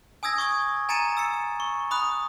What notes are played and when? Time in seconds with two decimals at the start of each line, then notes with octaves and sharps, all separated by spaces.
0.23 G#5 D#6 E6 G#6 A#6
0.38 C#6 D#6 G#6
0.89 G#5 A#5 A6 C#7 D#7 E7
1.17 E6 A6 C#7
1.60 C#6
1.91 B5 D#6 F#6